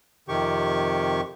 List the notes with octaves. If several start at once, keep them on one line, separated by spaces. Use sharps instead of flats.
F2 C3 D#3 G4 C#6